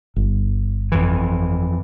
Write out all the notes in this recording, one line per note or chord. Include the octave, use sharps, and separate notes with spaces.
G1
F2 E3